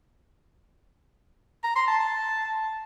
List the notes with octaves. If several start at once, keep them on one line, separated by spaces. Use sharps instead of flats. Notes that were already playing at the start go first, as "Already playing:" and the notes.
A#5
C6
A5
A5